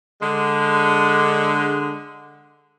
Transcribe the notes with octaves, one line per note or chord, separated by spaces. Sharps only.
D3 G#3